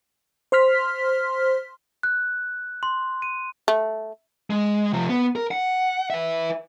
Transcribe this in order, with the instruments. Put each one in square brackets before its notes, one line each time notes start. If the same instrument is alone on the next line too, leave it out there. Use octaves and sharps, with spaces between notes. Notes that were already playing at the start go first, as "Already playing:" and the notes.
[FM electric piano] C5 C6 F6 B6
[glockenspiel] F#6
C6
D#7
[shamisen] A3
[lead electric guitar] G#3
C3 F3
B3
A#4
F#5
B4 E5